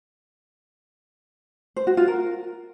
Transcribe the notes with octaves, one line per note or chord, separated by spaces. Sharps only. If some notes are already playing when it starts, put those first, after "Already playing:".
C5
F#4
F4
A#4